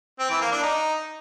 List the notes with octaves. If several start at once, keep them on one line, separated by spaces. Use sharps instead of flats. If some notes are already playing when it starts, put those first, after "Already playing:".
C4
E3
A#3
D4
D#4